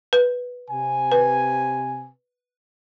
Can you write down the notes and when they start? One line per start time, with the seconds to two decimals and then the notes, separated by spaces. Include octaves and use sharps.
0.13 B4
0.70 C3 G#5
1.12 B4